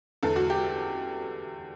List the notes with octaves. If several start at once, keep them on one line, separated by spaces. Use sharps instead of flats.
E2 D3 A4
F#4
G4